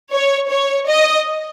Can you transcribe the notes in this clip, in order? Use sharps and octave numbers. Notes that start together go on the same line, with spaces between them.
C#5
C#5
D#5